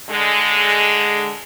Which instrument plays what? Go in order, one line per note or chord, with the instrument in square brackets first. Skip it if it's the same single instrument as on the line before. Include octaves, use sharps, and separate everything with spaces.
[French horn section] D3 G#3